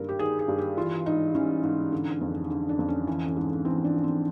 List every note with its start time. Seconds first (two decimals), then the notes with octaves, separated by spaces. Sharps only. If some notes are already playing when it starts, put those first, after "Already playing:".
Already playing: G2 D#3 A#4
0.09 G4
0.19 D#3 G#4
0.39 G#4
0.48 G2
0.58 G4
0.77 E3 F4
1.06 G#2 D#4
1.35 E3 C#4
1.64 G#2
1.92 D3
2.21 F2
2.50 D3
2.69 D4
2.79 F2
2.88 C#4
3.07 E3 C#4
3.27 C#4
3.36 G#2
3.65 E3 C4
3.85 D4
3.94 G#2
4.04 C4